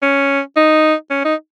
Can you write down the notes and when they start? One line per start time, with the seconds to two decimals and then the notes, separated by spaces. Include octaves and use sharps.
0.02 C#4
0.56 D#4
1.10 C#4
1.25 D#4